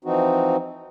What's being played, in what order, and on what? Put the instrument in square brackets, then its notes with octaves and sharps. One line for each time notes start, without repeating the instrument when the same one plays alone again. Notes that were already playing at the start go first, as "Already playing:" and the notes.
[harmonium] E3 F3 C4 D#4 F#4